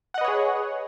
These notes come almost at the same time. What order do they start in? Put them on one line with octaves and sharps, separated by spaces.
F#5 D#5 B4 C#5 G#4